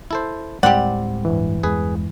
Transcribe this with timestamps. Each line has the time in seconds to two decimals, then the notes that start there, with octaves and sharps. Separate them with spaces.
0.11 E4 A4 C5
0.63 D1 A2 G3 G#3 C4 G4 D5 F#5
1.25 G2 E3
1.63 E2 G#3 G#4 B4